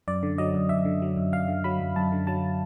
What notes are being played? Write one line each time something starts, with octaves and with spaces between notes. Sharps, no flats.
F#2 D5
D3
F#3 D#5
F#2
F#2 E5
D3
F#3
F#2
F#2 F5
D3
F#3 B5
F#2
F#2 A5
D3
F#3 A5